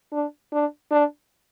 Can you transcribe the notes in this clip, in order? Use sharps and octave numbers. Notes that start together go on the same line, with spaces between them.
D4
D4
D4